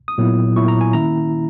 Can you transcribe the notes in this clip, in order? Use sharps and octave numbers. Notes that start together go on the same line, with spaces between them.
D#6
A#2 F#3 B3 E4
A#2 F#3 B3 E4 C#6
A#5
G#5
D#3 A#3 C#4 E4 A#5